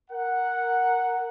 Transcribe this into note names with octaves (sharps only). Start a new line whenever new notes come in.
A#4 F#5